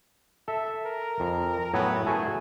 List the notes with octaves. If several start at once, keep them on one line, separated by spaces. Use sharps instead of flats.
A4 E5
A#4
F2
A2 F#3 B3 G#5
A3 F#4 G#4 G#5